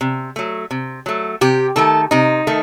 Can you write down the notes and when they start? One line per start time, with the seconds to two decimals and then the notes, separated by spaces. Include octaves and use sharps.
0.01 C3
0.36 F#3 A3
0.71 C3
1.06 F#3 A3
1.41 C3 G4
1.76 D#3 A3 A4
2.11 C3 D#4
2.47 D#3 A3